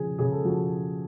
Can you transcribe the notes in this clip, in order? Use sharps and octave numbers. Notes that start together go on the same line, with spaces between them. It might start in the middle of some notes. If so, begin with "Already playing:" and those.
Already playing: C#3 F3 G#4
C#3 G#4
A4
F3 F#4